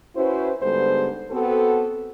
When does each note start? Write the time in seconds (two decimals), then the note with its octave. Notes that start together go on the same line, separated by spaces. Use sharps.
0.16 C#4 E4 F#4 B4 C5
0.62 G#2 D3 G3 B3 A4 C5
1.31 B3 C4 F#4 A4